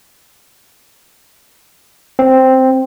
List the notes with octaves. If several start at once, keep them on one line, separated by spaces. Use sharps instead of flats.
C4